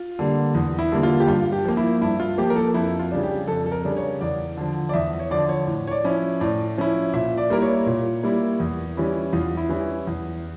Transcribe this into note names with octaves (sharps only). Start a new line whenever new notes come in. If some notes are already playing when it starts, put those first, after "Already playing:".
Already playing: F4
D3 G3 A#3
E2
E4
D3 G3 A#3
F4
G4
G2 F4
G4
F3 A#3
E4
G2 E4
F4
F3 A#3 G4
A#4
A4
F2 E4
F4
C#3 G3 D4
G4
F2 A4
A4
A#4
C#3 G3 D4
C#5
E2 D5
D3 F3
D5
E2 E5
C#5
D3 F3 D5
C#5
A2
C#5
D5
F3 C#4 E4
A2 D5
F3 C#4 E4
A#2 E5
D5
G3 A#3 E4 A#4
C#5
A#2
G3 A#3 E4
E2
E3 G3 C#4 E4
E2 F4
E4
E3 G3 C#4 E4
E2